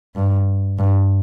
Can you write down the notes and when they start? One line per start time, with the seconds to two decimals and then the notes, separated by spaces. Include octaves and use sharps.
0.15 G2
0.78 G2